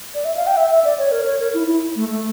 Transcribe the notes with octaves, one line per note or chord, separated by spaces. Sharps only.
D5
E5
F5
G5
E5
E5
D5
C#5
A#4
C#5
A#4
E4
E4
A3
A3